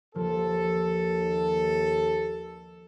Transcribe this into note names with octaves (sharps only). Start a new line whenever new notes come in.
D#2 F3 A4